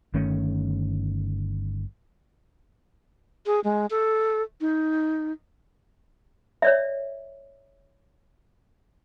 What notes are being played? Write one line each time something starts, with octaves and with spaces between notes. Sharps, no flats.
G1 D#3 A3 C#4
G#4
G#3
A4
D#4
C#5 D5 E5